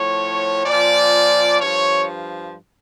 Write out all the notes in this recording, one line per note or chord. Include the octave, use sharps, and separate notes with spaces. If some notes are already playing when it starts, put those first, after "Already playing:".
Already playing: A2 F3 C#5
A#2 F3 D5
G2 F3 C#5